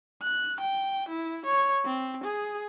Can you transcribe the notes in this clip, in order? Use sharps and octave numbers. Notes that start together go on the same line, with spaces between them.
F#6
G5
E4
C#5
C4
G#4